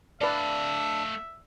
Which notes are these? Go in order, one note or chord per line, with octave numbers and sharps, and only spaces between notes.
A3 D4 B4 D5 E5 F5